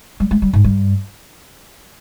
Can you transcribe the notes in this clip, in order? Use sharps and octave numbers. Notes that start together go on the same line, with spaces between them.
G3
G#3
G3
G#2
G2